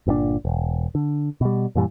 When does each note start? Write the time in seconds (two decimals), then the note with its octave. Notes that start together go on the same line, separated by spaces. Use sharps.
0.07 G1 A#2 D3 D4
0.45 E1
0.95 D3
1.41 B2 G3
1.75 F#2 A#2 E3 G3